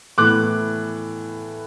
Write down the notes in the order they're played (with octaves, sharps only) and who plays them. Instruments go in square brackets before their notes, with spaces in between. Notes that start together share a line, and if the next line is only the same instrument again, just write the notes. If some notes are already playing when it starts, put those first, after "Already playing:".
[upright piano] A2 E3 B3 D6 F#6